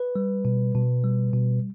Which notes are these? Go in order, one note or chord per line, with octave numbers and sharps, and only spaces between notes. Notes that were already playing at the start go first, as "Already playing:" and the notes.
Already playing: B4
G3
B2
B2
G3
B2